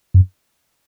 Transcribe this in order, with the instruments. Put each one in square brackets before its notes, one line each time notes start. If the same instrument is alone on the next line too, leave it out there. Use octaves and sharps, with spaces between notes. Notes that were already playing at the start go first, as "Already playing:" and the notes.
[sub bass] F#2